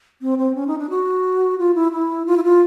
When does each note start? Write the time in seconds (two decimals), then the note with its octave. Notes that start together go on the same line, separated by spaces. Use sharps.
0.22 C4
0.38 C4
0.55 C#4
0.68 D#4
0.78 D4
0.90 F#4
1.58 F4
1.75 E4
1.92 E4
2.26 F4
2.37 E4
2.43 F4